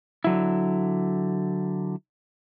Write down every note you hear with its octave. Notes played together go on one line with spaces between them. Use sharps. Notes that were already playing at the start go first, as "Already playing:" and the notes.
D3 F#3 E4